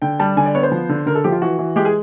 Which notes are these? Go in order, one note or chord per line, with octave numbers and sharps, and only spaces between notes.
D3 G5
G3 A5
D3 G#5
D5
B3 C#5
C5
F3
D3
D3 A#4
A4
F3 G4
F4
E3 F#4
E3
G#3 G4
G#4